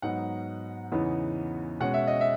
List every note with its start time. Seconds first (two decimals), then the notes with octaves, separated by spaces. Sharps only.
0.02 G#2 F#3 B3 D#4 F#5
0.92 E2 C#3 E3 B3 D#4
1.80 B2 G#3 C#4 F#5
1.94 E5
2.07 D#5
2.21 E5